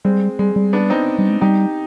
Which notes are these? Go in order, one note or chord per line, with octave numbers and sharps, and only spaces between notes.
G3 G#3 C4
G3 G#3
G3
B3 D4
C4 D#4
G3
G#3
G3 D#4 G4